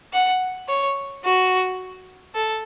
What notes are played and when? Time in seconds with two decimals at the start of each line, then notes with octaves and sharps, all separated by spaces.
0.13 F#5
0.69 C#5
1.25 F#4
2.35 A4